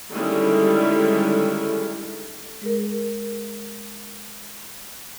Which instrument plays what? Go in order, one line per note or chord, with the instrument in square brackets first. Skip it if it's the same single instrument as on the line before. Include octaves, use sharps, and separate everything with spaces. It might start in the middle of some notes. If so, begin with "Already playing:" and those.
[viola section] D3 D#3 G3 G#3 C#4 E4
[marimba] G#3 G#4 A#4